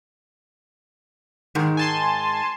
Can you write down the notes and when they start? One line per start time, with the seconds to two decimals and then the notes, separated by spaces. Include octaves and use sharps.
1.55 G#2 D#3 G#3
1.77 G#5 A5 C6